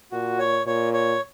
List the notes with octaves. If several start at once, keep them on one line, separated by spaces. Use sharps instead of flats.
A#2 F#4
C#5
A#2 C#5
C#5